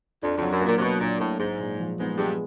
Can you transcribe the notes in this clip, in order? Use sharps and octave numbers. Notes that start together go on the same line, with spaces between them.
F2 D4
F2 F#3
F#2
A#2 A#3
C3
B2 F#3
A#2 D4
A2 F#3
G#2 G#3
A#2
F3
G#2 B3
G2 G#3